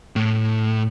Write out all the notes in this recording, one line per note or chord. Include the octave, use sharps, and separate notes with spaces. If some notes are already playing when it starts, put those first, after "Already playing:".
A2